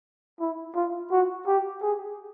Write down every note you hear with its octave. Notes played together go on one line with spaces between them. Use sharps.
E4
F4
F#4
G4
G#4